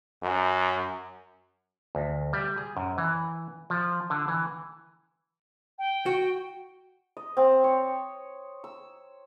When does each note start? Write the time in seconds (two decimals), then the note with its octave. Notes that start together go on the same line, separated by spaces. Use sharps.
0.22 F#2
1.95 D2
2.33 G3
2.58 G#4
2.77 F#2
2.98 E3
3.70 F3
4.10 D3
4.28 E3
5.78 G5
6.06 F#4
7.17 D#5
7.37 C4
7.64 C#5
8.64 E6